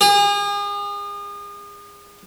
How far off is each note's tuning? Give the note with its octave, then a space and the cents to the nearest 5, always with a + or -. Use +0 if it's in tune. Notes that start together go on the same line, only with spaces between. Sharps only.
G#4 -35